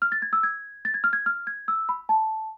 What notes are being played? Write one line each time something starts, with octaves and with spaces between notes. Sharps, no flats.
F6
A6
G#6
E6
G#6
A6
G#6
F6
G#6
F6
G#6
E6
B5
A5